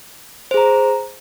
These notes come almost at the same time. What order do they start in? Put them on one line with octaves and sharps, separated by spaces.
C5 G#4 A#5